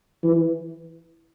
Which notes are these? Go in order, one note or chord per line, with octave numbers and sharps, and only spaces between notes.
E3